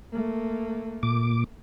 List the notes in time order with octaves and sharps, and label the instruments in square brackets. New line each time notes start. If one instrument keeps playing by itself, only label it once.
[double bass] A3 A#3
[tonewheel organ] A#2 D6